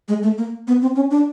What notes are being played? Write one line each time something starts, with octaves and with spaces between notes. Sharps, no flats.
G#3
A3
A#3
B3
C4
C#4
D4